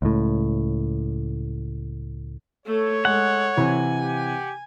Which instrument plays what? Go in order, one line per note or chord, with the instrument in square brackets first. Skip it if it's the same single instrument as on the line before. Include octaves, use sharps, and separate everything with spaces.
[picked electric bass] C#2 A2
[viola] A3 A4 [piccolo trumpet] C#5
[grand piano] G#3 [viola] A4 [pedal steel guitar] F#5
[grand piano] C3 E3 [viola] G#5
[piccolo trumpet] G4